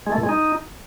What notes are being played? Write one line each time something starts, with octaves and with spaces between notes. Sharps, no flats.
G#3
A3
A#2
G#3
D#4